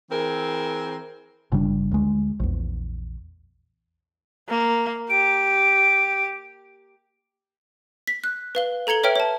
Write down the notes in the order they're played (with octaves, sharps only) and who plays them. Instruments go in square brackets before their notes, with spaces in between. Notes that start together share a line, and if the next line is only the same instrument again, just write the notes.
[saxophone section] E3 C4 G#4 A#4
[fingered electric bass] G1 C#3 G3 D4
D2 G#3
A#1 E2
[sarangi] A#3
[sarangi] G4 [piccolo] D7
[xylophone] B6
F#6
B4 F5 G7
A4 A#5 G#6 C#7 G7
B4 C#5 E5 G5 F6 D7
C#5 A5